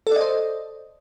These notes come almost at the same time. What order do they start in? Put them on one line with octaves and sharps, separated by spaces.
A4 D5 D#5 C5